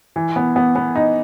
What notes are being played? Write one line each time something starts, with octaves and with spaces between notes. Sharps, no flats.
E3
B3
B3
B3
D#4